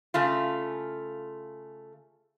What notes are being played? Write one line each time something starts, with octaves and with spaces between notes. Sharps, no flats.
C#3 A3 F4